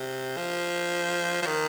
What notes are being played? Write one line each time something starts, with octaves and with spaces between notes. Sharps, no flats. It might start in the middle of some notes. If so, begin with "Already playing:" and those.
Already playing: C3
F3
F3
D#3